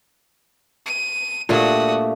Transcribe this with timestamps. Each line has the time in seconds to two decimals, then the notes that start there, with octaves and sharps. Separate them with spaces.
0.86 D#7
1.49 A#2 A3 D4 F#4 G4 D#6